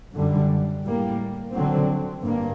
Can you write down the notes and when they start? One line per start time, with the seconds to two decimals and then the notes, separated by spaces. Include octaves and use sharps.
0.15 F#2 D3 G3
0.85 A2 G3 A#3
1.54 D3 F#3 C4
2.24 G2 A#3